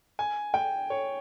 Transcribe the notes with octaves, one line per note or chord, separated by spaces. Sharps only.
G#5
G5
C#5